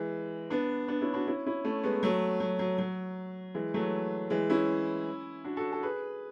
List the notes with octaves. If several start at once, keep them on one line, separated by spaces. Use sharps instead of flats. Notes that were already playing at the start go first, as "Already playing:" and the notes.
Already playing: E3 G#3
B3 D4
B3 D4
C#4 E4
D4 F#4
C#4 E4
C#4 E4
A3 C#4
G#3 B3
F#3 A3
F#3
F#3
F#3
E3 G#3
F#3 A3
E3 G#3
C#4 E4
D4 F#4
F#4 A4
A4
G#4 B4